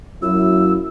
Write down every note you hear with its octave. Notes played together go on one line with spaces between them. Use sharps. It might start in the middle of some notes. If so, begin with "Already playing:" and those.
F#2 F#3 A#3 E4 E6